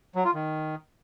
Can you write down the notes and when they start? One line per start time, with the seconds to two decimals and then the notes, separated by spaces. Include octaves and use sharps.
0.15 F#3
0.25 F4
0.34 D#3